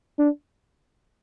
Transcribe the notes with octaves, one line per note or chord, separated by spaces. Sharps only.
D4